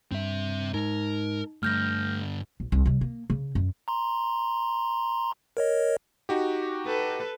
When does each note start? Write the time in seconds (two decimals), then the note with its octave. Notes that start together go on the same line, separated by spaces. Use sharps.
0.12 G2 C4 E5
0.74 G#2 D#4 A#4
1.63 G2 D3 A3 F6 G6 A#6
2.60 A#1
2.72 C2
2.86 C3 G3
3.01 A#3
3.30 C#3
3.55 F#2
3.88 A#5 C6
5.57 A#4 C#5 D#5
6.29 D#4 F#4 G4
6.86 A4 B4